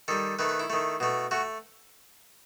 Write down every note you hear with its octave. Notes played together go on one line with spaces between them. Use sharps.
D#3 G3 A4
D#3 A3 B4
B4
E4
D#3 A3
B2 A3
A3 F#4